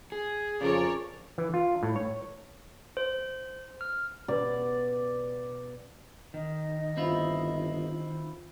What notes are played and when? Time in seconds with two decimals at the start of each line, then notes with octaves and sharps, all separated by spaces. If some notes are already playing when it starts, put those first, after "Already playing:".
0.12 G#4
0.61 F2 C#3 F3 C#4 A#4 C#5 D5
1.38 E3
1.54 F4
1.83 A2
1.96 C#5
2.97 C5
3.81 F6
4.28 B2 D5
6.34 D#3 D#5
6.97 G1 C4 E4 F4